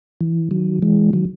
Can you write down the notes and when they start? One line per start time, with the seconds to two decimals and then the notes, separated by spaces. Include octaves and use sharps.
0.21 E3
0.51 D#3 F#3
0.82 E3 G#3
1.13 D#3 F#3